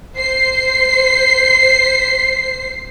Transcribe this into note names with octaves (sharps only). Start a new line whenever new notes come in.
C5 C7